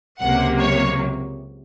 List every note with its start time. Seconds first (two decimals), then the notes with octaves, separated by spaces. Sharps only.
0.20 C#2 C3 F#3 A#3 F#5
0.60 C#5